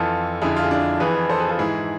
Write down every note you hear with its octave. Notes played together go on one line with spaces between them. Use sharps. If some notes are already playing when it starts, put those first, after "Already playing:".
Already playing: F2 E3 F4 A4
F2 D3 E4 G#4
F4
G#4
D4 F4
F2 E3 G#4 B4
A4 C5
G#4 B4
F4 A4
G#2 E3 E4 G#4